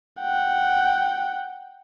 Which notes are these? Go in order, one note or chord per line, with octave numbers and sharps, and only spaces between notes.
F#5 G5